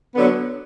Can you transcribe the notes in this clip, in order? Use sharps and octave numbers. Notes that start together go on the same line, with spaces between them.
D3 F#3 B3